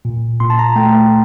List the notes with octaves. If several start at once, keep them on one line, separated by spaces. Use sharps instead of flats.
A#2
A#2 C6
A5
A#5
A3 G5